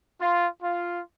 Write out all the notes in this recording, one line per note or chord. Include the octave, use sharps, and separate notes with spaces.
F4
F4